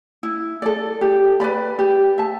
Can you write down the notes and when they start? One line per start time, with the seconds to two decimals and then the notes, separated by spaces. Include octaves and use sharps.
0.23 E4
0.62 A4 D5
1.01 G4
1.40 B4 D5 B5
1.79 G4
2.18 E5 A5